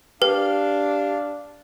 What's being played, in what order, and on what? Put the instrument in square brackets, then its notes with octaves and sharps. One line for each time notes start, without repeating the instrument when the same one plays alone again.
[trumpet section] D4 [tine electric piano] G4 [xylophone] B4 [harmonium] F5